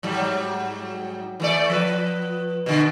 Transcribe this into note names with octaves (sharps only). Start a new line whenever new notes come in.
G#2 F#3 G3
E3 A3 D5
F3 B4
B2 D3